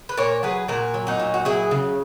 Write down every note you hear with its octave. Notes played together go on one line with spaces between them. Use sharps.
B4
A#2 A#4 C#5
F#3 G#4 B4
A#2 F#4 A#4
F#3
D#4 F#4
A#2
F#4
F#3 E4 G#4
C#3